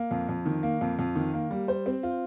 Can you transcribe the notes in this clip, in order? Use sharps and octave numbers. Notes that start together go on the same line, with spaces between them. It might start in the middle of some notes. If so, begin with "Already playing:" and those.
Already playing: A#3
F2
F2
D#3
A#3
F2
F2
D#3
A#3
G3
C5
C4
F4